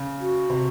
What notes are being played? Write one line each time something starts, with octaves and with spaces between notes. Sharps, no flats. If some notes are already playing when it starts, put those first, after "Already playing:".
Already playing: C#3
F#4
C3